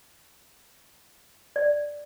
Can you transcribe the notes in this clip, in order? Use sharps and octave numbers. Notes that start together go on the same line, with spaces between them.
D5